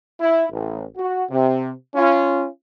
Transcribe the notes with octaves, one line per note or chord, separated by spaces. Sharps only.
E4
A1
F#4
C3
C#4 F4